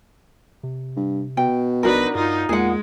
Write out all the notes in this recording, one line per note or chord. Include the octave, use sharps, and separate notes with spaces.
C3
G2
B2 G5
A#1 D4 D#4 F#4 A#4 B4
G2 D#4 F4
E2 A#2 G#3 G#4 F#5